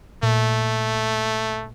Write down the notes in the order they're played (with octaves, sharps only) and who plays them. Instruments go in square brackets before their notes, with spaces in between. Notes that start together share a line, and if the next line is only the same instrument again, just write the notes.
[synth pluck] A#2 [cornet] A3